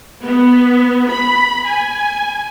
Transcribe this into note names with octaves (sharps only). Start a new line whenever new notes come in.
B3
B5
G#5